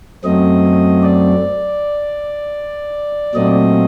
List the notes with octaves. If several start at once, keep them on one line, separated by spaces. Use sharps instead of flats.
F#2 F#3 A3 C4 D#5
D5
A#2 F#3 A3 C4 D#5